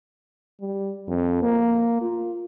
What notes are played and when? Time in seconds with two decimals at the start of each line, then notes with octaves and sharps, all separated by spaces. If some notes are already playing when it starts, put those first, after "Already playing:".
0.61 G3
1.08 F2
1.42 A#3
2.02 F4